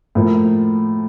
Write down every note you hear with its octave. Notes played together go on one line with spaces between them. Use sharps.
A2 F3 A#3